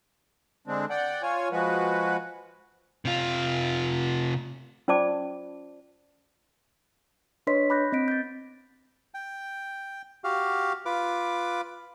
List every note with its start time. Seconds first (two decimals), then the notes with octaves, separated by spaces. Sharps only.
0.67 D3 G#3 C4 D4
0.90 D5 F#5 G5
1.22 F4 C#5 G#5
1.52 F3 G#3 F#4 B4
3.05 C3 F4
4.88 C#4 F4 C5 D5 A5 D6
7.47 D4 B4 C#5 D#5 C6 B6
7.70 B5 D6 F#6 G6 A#6
7.92 C4 D#5 B6 D7
8.08 G6 A6
9.14 G5
10.24 F#4 G4 F5
10.86 F4 B4 D6